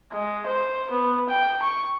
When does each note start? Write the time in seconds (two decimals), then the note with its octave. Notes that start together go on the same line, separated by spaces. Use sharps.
0.12 G#3
0.47 C5
0.91 B3
1.29 G5
1.62 C#6